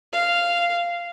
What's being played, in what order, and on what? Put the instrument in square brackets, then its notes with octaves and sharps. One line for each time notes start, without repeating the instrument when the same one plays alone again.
[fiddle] F5